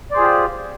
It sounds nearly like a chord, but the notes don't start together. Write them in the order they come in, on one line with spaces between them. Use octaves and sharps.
D5 C5 G#4 F4 G4